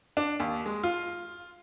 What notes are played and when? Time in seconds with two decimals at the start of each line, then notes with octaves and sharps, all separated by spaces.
0.17 D4
0.40 D#2
0.66 G#3
0.83 F4